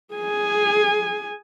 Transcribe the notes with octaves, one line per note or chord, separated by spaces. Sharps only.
G#4 G#5